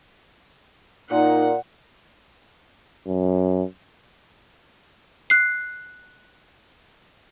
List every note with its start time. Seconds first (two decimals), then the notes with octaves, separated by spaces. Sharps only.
1.10 A#2 D#4 F#5
3.07 F#2
5.30 F#6 C7